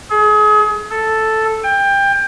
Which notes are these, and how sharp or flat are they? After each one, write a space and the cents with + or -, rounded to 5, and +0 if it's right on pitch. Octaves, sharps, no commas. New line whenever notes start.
G#4 +35
A4 +0
G5 +20